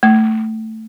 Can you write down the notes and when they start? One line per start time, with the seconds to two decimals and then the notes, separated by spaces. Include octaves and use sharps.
0.03 A3